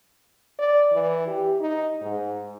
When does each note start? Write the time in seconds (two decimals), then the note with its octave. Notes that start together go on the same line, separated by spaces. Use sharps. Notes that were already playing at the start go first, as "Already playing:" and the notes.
0.59 D5
0.92 E3
1.27 G4
1.60 D#4
2.01 G#2